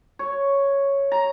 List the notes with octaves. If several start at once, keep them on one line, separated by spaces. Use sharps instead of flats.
C#5
A#5